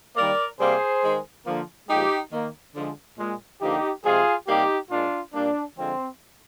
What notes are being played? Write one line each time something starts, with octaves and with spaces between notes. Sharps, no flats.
D#3 G3 A#3 A#4 D5
C3 G3 A#3 G#4 C5
D#3 G#3
D3 F3 A#3
A#2 F3 G#3 D#4 G4
D#3 A#3
D3 F3 G#3
A#2 G#3
D3 F3 A#3 D#4 G4
C3 F3 G#3 F4 G#4
C3 G3 A#3 D#4 G4
A#2 G#3 D4 F4
A#2 G3 A#3 D4
D3 F3 G#3 C4